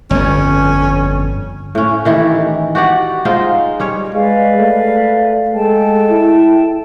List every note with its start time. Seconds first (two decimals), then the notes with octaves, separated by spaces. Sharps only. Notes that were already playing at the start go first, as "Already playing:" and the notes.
0.11 G1 F2 C#4
1.75 A2 C#4
2.05 D#3 E3 E4 G4
2.75 F#4 G4 D5 F#5
3.25 G#3 D#4 F4 C5
3.80 G3 C#4 C#5
4.14 G#3 B4 D5 F5
4.59 A3
5.54 G#3 A4 G5 A5
6.11 E4